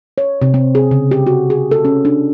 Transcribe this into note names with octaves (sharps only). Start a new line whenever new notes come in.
C#5
C3
C4
G#4
C#3
G4
F#4
G#4
A4
C#4
D4